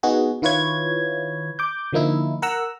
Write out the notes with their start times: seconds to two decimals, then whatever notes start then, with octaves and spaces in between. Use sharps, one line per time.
0.03 B3 D#4 F#4 G#4
0.42 D#3 E4 F4 B4 C#5 G#6
1.59 D6 G6
1.93 D3 F3 A#3 D#4 E4
2.42 A#4 F#5 A#5 E6